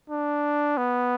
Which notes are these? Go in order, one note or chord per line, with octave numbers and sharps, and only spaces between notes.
D4
B3